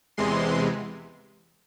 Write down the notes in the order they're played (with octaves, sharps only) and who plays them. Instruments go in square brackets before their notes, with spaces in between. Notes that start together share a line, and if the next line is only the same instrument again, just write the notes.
[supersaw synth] E2 C3 E3 G#3 C6